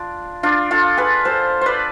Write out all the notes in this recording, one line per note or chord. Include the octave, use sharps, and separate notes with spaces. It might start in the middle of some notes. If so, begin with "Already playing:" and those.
Already playing: D4 F4
D4 F4
F4 A4
G#4 B4
A4 C5
B4 C5 D5